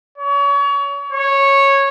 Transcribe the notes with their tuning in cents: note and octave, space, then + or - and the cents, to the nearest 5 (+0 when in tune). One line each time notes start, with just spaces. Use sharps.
C#5 +35
C#5 -10